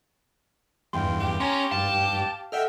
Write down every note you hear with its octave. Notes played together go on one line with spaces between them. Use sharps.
E2 G2 F5 G5 C6
G4
C#4 A#5 C6
G2 F5 A5
A4 D#5 E5 F#5 G5 F6